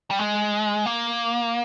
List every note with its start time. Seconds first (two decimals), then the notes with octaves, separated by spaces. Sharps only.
0.11 G3
0.19 G#3
0.86 A#3